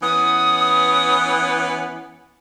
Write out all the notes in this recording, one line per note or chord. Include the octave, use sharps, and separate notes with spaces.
E3 B3 C#4 D#6